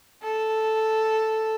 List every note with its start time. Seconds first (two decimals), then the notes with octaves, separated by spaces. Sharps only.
0.23 A4